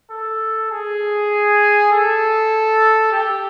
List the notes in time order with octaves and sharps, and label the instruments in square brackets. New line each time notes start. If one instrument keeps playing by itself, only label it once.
[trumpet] A4
G#4
A4
G4